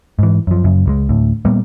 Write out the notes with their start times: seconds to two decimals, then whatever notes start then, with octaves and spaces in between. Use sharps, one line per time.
0.19 G#2 E3
0.47 F#2 F3
0.64 F#2 C#3
0.86 C#2 G3 G#3
1.09 D2 A2
1.45 A#2 G3 A#3 B3